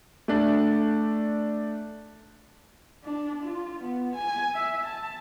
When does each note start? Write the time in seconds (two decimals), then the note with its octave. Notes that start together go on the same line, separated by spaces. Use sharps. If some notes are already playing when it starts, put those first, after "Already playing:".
0.28 A3 D4
3.04 D4
3.43 F4
3.83 B3
4.16 G#5
4.54 E5
4.85 A5